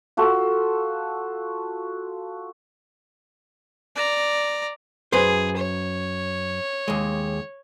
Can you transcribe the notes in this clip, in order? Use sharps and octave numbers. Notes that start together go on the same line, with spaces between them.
F4 F#4 A4
D5 A#5
F#2 G#4 B4 C5
C#5
D#2 G#3